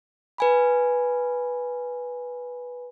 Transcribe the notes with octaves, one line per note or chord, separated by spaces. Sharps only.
B4 G#5 B5